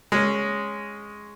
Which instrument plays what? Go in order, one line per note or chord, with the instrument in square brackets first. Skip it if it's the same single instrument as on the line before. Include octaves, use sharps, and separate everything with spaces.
[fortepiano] G#3 C#4